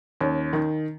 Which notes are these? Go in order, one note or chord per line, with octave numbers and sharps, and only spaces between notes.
D#2 C#4
D#3